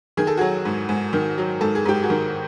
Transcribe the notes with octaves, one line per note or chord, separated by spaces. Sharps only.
D#3 G#4
A4
F#3 F#4 G#4
G#2
G#2
D#3
F#3
G#2 A4
G#4
G#2 G4
F#4 G#4
D#3